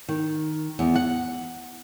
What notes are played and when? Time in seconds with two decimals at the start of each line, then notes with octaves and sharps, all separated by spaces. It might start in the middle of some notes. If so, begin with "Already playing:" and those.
0.09 D#3
0.79 E2
0.96 F#5